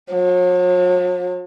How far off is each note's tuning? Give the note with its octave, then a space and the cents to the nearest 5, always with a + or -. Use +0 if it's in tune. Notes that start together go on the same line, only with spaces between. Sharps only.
F#3 -45